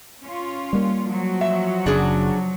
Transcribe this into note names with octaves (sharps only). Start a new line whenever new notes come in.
C#4 F4
G3 A#3
F3 F#3 F#4
E5
F#1 C#3 D4 G#4